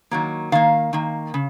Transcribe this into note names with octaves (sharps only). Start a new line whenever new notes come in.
D#3 F#3 A#3
D#3 A#3 F5
D#3 A#3
C#3